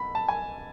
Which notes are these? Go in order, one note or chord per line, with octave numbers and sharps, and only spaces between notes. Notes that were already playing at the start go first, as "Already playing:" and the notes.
Already playing: B2 B5
A5
G#5